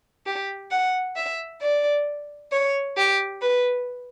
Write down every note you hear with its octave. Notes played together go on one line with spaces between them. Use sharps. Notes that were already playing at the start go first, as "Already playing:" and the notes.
G4
F#5
E5
D5
C#5
G4
B4